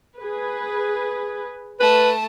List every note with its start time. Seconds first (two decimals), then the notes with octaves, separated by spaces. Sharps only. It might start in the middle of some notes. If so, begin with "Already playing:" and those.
0.18 G#4 B4
1.80 A3 B4 A5